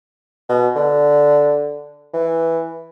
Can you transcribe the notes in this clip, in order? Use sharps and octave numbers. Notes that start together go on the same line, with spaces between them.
B2
D3
E3